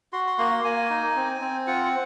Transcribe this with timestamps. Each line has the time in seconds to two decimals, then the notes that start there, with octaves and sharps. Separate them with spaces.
0.13 F#4 C6
0.27 C6
0.38 A#3 C6
0.64 A#3 G#5
0.90 D#4
1.16 C4
1.41 C4
1.67 F4 F#5